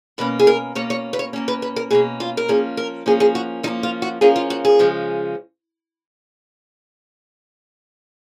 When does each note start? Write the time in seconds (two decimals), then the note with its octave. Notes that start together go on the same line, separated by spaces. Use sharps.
0.18 B2 A#3 C#4 B4
0.39 G#4
0.47 A#4
0.75 B2 A#3 C#4 C#5
0.90 C#5
1.13 B4
1.19 C#5
1.33 B2 A#3 C#4
1.48 B4
1.62 B4
1.76 A#4
1.90 B2 A#3 C#4 G#4
2.20 F4
2.37 A#4
2.48 F3 A#3 C#4 G#4
2.77 A#4
3.06 F3 A#3 C#4 G#4
3.20 G#4
3.35 F#4
3.63 F3 A#3 C#4 D#4
3.83 F4
4.02 F#4
4.21 F3 A#3 C#4 G#4
4.36 F4
4.50 F#4
4.65 G#4
4.79 C#3 F3 G#3 C#4